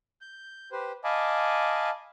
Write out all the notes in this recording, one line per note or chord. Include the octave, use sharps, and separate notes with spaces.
G6
G4 B4 C5
D#5 F5 G#5 A5 B5 D6